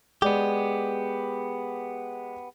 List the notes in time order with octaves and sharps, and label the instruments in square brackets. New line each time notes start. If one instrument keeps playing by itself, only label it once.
[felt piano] G#3 D5 [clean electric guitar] B3 G4